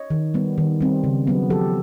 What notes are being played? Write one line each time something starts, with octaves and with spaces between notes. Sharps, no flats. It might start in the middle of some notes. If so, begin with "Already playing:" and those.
Already playing: C#5 D#5
D#3
G3 B3
D#3
G3 C4
C#3
F#3 B3
F3 G4 A4